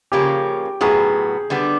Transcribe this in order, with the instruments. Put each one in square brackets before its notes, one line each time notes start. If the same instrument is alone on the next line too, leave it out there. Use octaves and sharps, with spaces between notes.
[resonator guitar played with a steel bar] C#3 F3 A#3 C#4 [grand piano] G4
[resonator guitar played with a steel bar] A2 F#3 B3 [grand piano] G#4
[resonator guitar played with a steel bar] D3 G3 B3